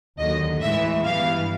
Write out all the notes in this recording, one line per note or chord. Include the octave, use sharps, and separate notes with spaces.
D#2 D3 F#3 D#5
A2 E3 G#3 E5
G2 E3 G3 B3 F5